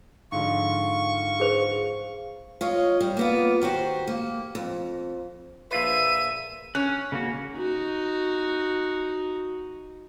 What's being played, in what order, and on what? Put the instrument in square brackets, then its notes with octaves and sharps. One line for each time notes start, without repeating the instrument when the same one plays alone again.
[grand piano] G#2 D3 F3 [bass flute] F5 [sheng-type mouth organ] C#6
[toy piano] G#4 C5
[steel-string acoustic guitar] F4 C#5 D#5
G3
A#3 B3 F4
D#3 F#4 G4 C5
A#3
F2
[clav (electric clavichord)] A#1 F4 B4 [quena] E5 [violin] D#7
[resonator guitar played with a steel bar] C#4 [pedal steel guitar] F#6
[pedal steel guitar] C#3 A#3 F#4
[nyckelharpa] D#4 F#4